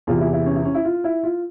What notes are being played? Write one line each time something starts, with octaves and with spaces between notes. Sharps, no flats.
E2 C3 E3 F4
E4
E4
C#4
E4
C#4
E4
F4
E4
F4